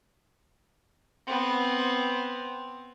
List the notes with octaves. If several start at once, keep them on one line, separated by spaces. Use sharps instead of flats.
B3 C4